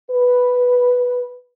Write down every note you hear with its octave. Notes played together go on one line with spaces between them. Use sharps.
B4